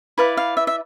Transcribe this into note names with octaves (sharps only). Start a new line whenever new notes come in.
E4 B4 D5 F5
F5
E5
E5